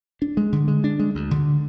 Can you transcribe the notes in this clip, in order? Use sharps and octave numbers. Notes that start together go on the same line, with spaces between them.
D4
G#3
D3
G#3
D4
G#3
D2
D3